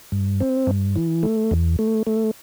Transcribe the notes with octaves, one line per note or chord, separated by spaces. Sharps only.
G2
C4
G2
E3
A3
E2
A3
A3